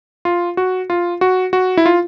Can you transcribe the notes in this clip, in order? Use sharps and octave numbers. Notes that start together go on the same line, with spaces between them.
F4
F#4
F4
F#4
F#4
E4
F4